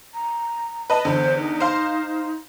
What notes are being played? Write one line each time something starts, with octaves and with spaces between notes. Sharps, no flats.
A#5
B4 D#5 A5
E2 D3 C5
D#4
C5 F5 C6